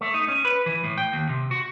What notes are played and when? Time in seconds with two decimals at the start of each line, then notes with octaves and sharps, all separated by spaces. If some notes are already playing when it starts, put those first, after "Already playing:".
0.01 A3
0.14 D#4
0.28 C#4
0.45 B4
0.66 E3
0.84 A2
0.98 G5
1.13 D#2
1.29 C3
1.51 F#4